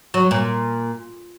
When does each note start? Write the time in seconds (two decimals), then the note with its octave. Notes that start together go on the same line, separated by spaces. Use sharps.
0.14 F#3
0.31 A#2